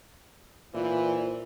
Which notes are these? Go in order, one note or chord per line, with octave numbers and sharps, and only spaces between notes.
A#2 E3 F4 C5 D5